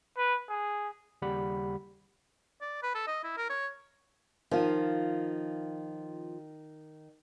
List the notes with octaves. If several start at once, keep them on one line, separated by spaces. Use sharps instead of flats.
B4
G#4
D#2 C#3 G3 G4 F#5 B5
D5
B4
A4
D#5
E4
A#4
C#5
D#3 F3 F4